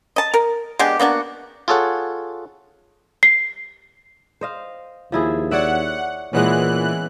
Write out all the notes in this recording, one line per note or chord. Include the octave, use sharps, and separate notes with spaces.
D#5 A5
A#4
G#3 B3 D4 G4
A#3 B3 D4 F#4
F4 G#4 A4 C#5 F#5
C7
C5 D#5 F5
D#2 F3 E4 G#4
C#5 D5 E5 F#5
A#2 E3 G#3 B3 C#4 F#6